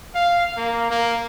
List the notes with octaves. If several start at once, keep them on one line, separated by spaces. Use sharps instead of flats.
F5
A#3
A#3